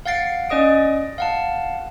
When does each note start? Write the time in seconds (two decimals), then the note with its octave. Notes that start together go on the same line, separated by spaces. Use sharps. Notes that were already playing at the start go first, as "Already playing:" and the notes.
0.06 F5 F#5 A6 C7 D7
0.50 C#4 D5 D#5 D#6 D7
1.18 F5 F#5 A5